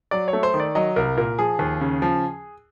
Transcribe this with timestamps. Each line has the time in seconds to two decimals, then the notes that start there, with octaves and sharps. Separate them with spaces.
0.11 F#3 D5
0.28 C#5
0.33 A3
0.43 C5
0.54 D#3
0.60 D5
0.75 F#3 D#5
0.96 C2 A#4
1.17 A#2 A#4
1.39 F3 G#4
1.59 D#2
1.81 C#3
2.02 F3